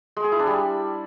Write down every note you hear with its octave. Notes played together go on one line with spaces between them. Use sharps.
G#3
G#4
E4
D4
G3